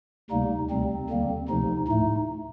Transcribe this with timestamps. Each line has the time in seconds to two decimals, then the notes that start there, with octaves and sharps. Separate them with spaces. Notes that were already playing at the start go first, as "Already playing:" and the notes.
0.30 D2 C3 G3 A#3 D#4
0.70 D2 C3 G3 C4
1.09 D#2 D3 G3 A#3
1.49 D2 C3 F3 D#4
1.88 A2 A3 D#4